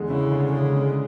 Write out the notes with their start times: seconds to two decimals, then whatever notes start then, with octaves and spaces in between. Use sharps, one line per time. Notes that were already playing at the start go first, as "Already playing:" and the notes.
Already playing: E2 D3 G#3
0.09 C#3 E4
0.32 D3
0.53 C#3 G#3
0.75 G#3